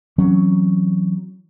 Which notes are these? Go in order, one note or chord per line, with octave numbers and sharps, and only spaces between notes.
E3 F#3 C4 C#4